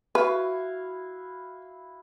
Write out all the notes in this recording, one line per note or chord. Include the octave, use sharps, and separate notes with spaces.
E4 F#4 B4 F5